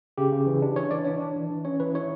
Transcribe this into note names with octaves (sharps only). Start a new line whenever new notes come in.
C#3 G4
C#3
E3
D4
E3 C#5
E3 D5
D4 C#5
D4 D5
E3
E3
C#4 C#5
E3 B4
E4 C#5